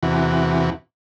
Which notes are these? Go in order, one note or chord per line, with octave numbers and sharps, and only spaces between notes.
E2 C3 E3 F#4